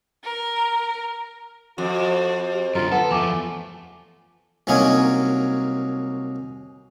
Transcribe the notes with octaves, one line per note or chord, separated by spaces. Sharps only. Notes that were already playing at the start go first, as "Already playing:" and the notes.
A#4
F2 F#4
G4
F#2 D3 F4 A#5
B3 A4 F#5
E2 F3 A3 G#5 D6
C2 F#3 A#3 C#4 D#4 C#5